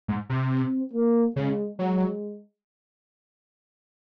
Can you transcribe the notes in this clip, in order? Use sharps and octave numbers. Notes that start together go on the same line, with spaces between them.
G#2
C3
C4
A#3
C#3 G#3
F#3 G#3